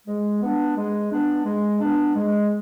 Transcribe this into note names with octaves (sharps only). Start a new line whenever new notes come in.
G#3
B3 D4
G#3
B3 D4
G#3
B3 D4
G#3